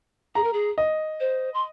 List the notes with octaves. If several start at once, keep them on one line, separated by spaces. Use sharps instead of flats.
G#4 A#5
A#4
G#4
D#5
C5
C6